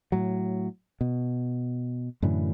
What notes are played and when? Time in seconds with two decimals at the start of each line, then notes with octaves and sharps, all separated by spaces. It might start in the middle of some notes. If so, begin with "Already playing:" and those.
0.12 A2 F#3
1.01 B2
2.22 F#2 A2 D3 E3